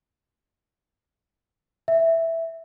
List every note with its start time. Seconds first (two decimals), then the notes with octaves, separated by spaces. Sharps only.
1.88 E5